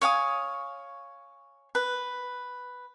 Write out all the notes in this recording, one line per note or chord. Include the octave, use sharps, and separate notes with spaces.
C#5 F5 G#5 D#6
B4